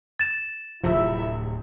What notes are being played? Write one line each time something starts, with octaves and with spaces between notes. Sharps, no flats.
A6 E7
D1 C3 F3 E4 E5